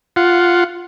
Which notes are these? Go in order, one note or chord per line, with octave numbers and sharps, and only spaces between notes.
F4 F#5